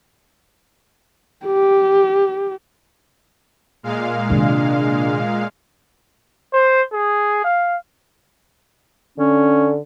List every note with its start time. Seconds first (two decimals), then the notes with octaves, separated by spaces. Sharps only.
1.46 G4
3.83 A#2 G#3 F5
4.30 C3 D#3 D4
6.53 C5
6.93 G#4
7.44 F5
9.18 D3 C#4